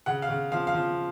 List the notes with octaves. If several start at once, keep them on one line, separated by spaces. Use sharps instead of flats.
C#3 F#5
F5
C#3
F3 F5
F5
F3